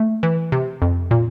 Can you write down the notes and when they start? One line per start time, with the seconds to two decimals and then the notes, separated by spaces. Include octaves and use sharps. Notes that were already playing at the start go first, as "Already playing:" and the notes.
Already playing: A3
0.23 E3
0.52 C3
0.82 F2
1.11 A#2